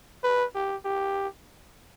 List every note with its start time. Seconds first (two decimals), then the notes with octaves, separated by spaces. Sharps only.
0.24 B4
0.55 G4
0.85 G4